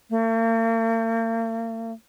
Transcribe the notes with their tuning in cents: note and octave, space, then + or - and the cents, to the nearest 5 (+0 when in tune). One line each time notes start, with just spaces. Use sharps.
A#3 -45